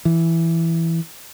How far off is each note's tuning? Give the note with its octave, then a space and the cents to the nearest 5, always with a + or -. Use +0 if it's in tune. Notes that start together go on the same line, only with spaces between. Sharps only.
E3 +5